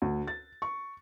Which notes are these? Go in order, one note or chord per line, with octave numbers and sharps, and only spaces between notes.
D2
A6
C#6